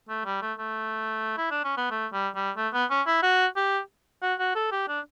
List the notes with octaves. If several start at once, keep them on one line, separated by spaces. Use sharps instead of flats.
A3
G3
A3
A3
E4
D4
C#4
B3
A3
G3
G3
A3
B3
C#4
E4
F#4
G4
F#4
F#4
A4
G4
D4